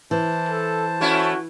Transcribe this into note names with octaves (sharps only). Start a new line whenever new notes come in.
E3 C5 A5
A4
A3 C#4 E4 F#4